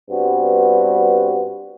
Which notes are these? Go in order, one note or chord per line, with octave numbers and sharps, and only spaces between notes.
G2 G3 B3 C4 F#4